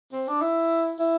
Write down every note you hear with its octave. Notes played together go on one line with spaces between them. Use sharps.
C4
D4
E4
E4